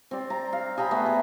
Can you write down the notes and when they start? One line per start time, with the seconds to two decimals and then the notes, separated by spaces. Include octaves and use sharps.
0.11 C4 D5
0.30 A#5
0.53 F5
0.78 G#4 G5 A#5 B5
0.91 A3 B3
1.06 G#4